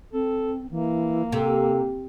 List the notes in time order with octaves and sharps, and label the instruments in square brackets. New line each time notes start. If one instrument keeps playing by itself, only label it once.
[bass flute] C4 [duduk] A4
[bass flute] E3 [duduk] A#3
[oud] C3 [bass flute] A4